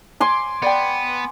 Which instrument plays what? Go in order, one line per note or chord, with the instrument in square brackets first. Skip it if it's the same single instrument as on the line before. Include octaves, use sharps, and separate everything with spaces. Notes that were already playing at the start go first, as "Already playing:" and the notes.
[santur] G#5 C6 D6
[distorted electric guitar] B3 [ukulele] D5 G5